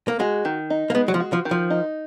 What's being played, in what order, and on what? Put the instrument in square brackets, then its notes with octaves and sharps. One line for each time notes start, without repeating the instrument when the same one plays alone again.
[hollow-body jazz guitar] A#3
[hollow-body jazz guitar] G#3 [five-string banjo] F#4
[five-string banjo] D#3
D#4
[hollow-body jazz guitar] A#3
[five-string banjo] G#3 [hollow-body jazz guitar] B3
[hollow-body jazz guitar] F#3
F3
[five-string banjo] F#4
[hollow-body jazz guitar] F3
[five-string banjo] D#3
[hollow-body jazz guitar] F3
[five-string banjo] D#4